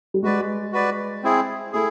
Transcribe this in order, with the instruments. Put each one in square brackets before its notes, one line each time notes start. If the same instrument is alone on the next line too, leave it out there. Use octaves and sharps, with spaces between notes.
[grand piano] G3
[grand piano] G#3 [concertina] F#4 B4 D5
[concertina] F#4 B4 D5
C4 E4 G#4
[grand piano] A3 [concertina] E4 G#4